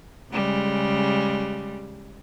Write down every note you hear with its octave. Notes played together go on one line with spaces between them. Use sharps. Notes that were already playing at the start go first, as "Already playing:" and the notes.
C#3 G3 G#3